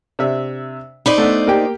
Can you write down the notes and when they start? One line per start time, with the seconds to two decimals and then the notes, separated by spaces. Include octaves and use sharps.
0.19 C3 D4 E5
1.06 D#4 C5 D5 B5
1.18 A3 B3 D4
1.47 A#3 G4 G5